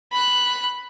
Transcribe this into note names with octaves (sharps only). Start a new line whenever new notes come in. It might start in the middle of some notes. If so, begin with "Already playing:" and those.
B5 F#6